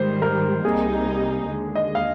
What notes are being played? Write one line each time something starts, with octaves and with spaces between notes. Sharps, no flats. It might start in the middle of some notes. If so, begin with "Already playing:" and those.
Already playing: G#2 D#3 G3 C5
A#4
C2 C3 G3 A#3 D#4 G#4
D#2 D3 G#3
D#5
F5